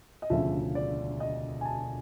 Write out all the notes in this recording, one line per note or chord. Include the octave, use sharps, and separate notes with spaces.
D#5
E1 D2 C#3 F3 E5
D5
D#5
G#5
A5